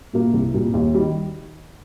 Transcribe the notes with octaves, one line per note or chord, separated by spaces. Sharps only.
A#2 G3 A#3
C2
A#2 G3 A#3
D#2
D#3 G3